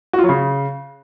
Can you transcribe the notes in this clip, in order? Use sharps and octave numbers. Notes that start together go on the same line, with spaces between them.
F#4
F4
F#3
C#3